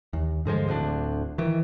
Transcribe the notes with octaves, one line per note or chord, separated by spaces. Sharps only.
D#2
G2 D3 F3 G#3
D1 D2 D3 D4
D#3 E3